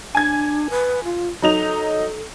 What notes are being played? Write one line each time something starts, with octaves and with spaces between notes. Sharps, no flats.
D4 G#5 G#6
B4
F4
F#3 D#4 A4 F7